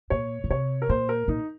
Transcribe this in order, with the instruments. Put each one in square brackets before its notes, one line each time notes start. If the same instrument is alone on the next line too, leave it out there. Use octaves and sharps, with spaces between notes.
[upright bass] A#2 [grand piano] C#5
[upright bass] A#2
[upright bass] C3 [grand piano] C#5
[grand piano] A#4
[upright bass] A#2 [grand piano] C5
[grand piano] A#4
[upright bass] A#2 [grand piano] D#4